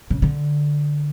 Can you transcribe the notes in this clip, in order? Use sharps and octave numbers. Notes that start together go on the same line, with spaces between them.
C#3
D3